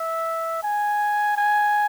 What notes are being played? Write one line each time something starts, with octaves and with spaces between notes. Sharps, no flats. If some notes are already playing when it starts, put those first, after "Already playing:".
Already playing: E5
G#5
G#5